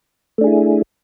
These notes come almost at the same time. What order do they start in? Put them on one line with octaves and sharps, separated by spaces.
A3 D4 G#4 E4